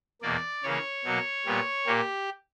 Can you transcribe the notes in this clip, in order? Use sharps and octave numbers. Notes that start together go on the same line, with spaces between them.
E2 B2 A#3 D5
C#3 E3 A#3 C#5
B2 F#3 A#3
A#2 G3 B3
A#2 A#3 G4